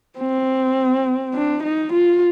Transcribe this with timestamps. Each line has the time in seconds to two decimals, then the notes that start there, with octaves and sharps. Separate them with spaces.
0.19 C4
1.34 D4
1.63 D#4
1.93 F4